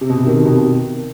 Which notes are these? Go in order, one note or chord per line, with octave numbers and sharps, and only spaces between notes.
C3
B2
C3
D#3
C3
B2
B2